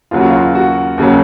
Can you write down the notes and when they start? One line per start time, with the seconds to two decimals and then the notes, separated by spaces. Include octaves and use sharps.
0.11 D#2 C#3 F#3 F4
0.20 F#4
0.30 F4
0.55 F#4
0.98 D#2 C#3 F#3